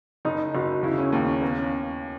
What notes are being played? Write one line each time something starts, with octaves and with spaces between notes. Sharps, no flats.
F#1 D#4
F#1 F#4
C#3 E4
C#4
D#2 A#3
C#4
A#3 B3
C#4